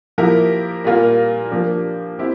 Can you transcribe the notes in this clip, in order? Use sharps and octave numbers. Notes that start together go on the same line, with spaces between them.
F3 A#3 E4 G4 A#4
A#2 G3 A#3 F4 A#4
F3 A#3 D4 G4
C4 E4 G4